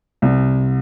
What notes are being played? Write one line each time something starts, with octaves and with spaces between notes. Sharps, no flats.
C2